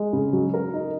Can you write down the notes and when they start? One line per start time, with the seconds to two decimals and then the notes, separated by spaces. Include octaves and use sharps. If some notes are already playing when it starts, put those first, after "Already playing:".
Already playing: G#3
0.13 C#3
0.33 F#3
0.54 A#4
0.73 D#4